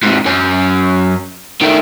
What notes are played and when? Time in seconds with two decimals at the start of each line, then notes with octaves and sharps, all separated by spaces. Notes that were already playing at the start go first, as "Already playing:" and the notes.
0.03 G#2 C3
0.26 F#2 C#4
1.62 D#3 A3